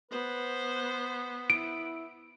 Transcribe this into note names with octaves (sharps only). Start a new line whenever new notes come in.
B3 B4 C5
E4 D7